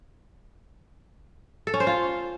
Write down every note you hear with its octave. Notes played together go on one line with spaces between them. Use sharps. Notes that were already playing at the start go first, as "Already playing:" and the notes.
A4
C#4
C5
F4